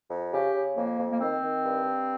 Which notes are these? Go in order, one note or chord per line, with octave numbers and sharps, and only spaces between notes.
F2
C#3 G4
C#3
F2 A#3
F2
A#3
D#3 C4
D#3
G2
G2